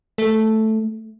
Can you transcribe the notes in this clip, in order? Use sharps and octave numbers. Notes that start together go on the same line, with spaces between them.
A3